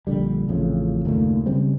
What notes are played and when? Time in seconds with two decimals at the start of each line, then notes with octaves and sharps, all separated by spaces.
0.07 A#1 D3 G3
0.49 A1 F2 C#3
1.05 F#1 D#2 A#2 A3
1.46 C#3 G3 G#3 C4